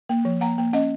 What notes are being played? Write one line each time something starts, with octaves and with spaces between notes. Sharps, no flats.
A#3
F3
A#3 F#5 A#5
A#3
C#4 D#5 F#5